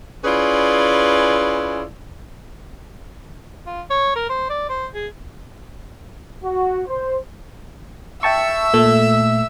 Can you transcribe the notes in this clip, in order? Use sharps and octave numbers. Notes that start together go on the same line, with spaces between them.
C#4 E4 F4 G#4 B4 D5
F4
C#5
A#4
C5
D5
C5
G#4
F#4
C5
E5 G5 A5 C#6 E6
A#2 A3